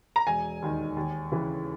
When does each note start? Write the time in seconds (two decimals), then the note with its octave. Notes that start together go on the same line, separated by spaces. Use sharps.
0.16 A#5
0.27 E1 G#5
0.62 D#2 D#3
0.96 D#2
1.31 C#3 E3